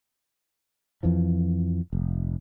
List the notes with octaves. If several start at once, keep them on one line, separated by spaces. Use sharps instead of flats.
F2 E3 F3
F1